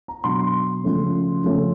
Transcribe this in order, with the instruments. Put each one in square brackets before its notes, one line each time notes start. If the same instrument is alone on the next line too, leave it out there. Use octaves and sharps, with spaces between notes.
[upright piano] A#5
B2 F#3 B3 D4 C6
C#3 F3 A3 C#4
C#3 F3 A3 C#4